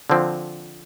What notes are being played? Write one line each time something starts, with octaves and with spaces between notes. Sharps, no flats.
D3 F3 C4